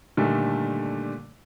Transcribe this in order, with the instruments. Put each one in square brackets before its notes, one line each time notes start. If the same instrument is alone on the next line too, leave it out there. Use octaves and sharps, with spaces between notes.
[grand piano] A#2 D3 D#3 G3 A3